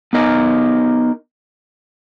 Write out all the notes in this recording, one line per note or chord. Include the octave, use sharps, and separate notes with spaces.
B3 D#4 A#4 D#5